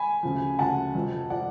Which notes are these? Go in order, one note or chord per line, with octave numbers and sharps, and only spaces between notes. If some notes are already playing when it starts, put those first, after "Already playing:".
Already playing: G#5 B5
D2 C#3 F3
D2 C#3 F3 F#5 A5
F1 F2 F3
F3 D5 F#5